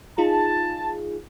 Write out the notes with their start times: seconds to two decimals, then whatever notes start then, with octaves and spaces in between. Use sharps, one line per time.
0.18 D#4 F4 G#4 A5